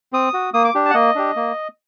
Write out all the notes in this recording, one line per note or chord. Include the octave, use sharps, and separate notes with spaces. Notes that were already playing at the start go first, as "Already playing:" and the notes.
C4 D#6
F#4
A#3 D#6
D6
D4 G4
A5
F#5
A#3 D#5
D4 G4
A#3